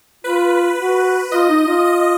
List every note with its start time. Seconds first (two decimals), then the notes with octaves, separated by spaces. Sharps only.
0.24 F4 B4
0.78 F#4
1.32 F4 D#5
1.49 D#4
1.67 F4
1.85 D#5